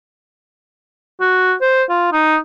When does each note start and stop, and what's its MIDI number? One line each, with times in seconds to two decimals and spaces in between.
1.20 1.54 66
1.61 1.83 72
1.89 2.07 65
2.12 2.37 63